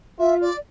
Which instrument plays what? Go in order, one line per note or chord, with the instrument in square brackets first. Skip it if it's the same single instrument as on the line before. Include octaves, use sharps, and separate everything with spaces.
[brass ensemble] F4 [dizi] E5
[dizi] D5